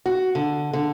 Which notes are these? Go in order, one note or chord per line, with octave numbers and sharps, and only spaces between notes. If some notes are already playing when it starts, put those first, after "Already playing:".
F#4
D3
D3